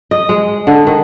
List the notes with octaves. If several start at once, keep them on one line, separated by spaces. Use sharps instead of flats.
D#5
G#3
D3
D#3